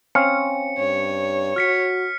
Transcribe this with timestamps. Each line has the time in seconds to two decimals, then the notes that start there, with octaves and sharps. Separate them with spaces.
0.15 C4 C#4 F5 C#7
0.79 G2 C#5
1.56 F#4 F6 B6 C#7